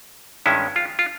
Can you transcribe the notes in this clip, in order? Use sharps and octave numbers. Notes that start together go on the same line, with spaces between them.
G2 D#3 G#3 C#4 E4
F4
F4